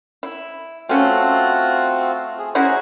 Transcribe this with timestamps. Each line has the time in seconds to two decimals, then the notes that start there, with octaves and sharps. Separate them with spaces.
0.23 E4
0.89 A3 C4 C#4 F4 F#4
2.39 G#4
2.55 C#4 E4 F#4 G#4 C5 A#5